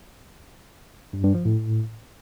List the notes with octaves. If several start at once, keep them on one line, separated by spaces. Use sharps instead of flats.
G2
G2
F3
A2